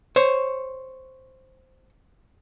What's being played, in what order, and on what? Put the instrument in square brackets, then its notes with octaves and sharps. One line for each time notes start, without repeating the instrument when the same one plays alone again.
[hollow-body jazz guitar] C5 C#5